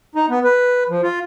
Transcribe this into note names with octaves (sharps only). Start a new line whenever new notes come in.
D#4
B3
B4
F3
F4